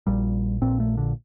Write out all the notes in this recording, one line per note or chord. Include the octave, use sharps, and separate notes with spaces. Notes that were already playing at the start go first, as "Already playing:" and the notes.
A#1 A#2 G3
A#1 A#2 C4
A3
D3